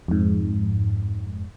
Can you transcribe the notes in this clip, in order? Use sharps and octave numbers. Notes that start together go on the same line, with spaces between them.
F2 G#2